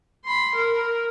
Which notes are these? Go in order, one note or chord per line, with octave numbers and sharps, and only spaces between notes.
B5 C6
A#4